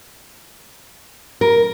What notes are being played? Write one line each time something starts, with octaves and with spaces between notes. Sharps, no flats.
A#4